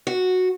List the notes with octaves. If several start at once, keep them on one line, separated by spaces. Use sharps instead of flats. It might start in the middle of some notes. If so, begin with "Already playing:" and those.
F#4